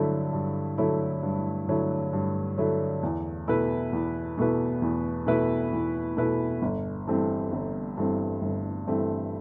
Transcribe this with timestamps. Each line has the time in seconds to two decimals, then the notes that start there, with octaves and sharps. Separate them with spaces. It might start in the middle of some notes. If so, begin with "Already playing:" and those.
Already playing: G2 D3 F#3 A3 E4
0.33 G2
0.78 D3 F#3 A3 E4
1.23 G2
1.68 D3 F#3 A3 E4
2.13 G2
2.58 D3 F#3 A3 E4
3.03 E2
3.48 B2 A3 E4 B4
3.93 E2
4.38 B2 A3 E4 B4
4.82 E2
5.27 B2 A3 E4 B4
5.72 E2
6.17 B2 A3 E4 B4
6.62 G1
7.07 G2 E3 A3 C4
7.52 G1
7.97 G2 E3 A3 C4
8.42 G1
8.87 G2 E3 A3 C4